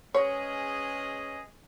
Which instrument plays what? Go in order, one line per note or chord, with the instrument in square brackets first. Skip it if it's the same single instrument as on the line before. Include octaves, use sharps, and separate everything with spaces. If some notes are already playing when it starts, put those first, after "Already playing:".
[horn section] G#3 C#4 G#4 B4 D#5 [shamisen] C#5